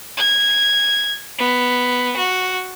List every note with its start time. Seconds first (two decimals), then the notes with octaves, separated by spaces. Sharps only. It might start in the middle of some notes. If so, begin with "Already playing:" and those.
0.17 G#6
1.39 B3
2.17 F#4